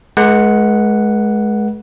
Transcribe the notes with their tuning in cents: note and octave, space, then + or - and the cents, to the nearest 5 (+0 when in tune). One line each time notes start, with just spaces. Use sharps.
G#3 +25 B4 -35 F#5 +0